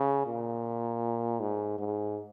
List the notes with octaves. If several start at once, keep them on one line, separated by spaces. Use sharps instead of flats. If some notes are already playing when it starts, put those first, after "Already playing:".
Already playing: C#3
A#2
G#2
G#2